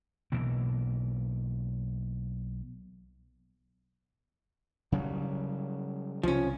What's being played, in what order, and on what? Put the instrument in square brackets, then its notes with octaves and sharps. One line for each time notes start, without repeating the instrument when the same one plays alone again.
[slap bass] B1 B2 E3 A#3
C#3 F#3 G3
[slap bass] C2 [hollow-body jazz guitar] F3 C#4